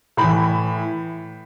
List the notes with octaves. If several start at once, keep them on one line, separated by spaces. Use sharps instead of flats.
A2 E3 B5